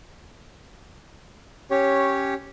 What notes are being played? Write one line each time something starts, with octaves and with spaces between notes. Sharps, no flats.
C#4 G4 C#5